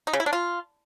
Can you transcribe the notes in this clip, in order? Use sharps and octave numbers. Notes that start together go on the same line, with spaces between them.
D#4
C#3
E4
D4
F4